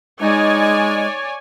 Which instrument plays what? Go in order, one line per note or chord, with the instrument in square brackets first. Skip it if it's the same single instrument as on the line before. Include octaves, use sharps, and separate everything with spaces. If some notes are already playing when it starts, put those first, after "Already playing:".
[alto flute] G#3 [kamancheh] D#4 [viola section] C#5 D5 G#5